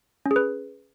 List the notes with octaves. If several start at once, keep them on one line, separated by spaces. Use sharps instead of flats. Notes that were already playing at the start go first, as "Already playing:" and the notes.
C#4
G#4
B4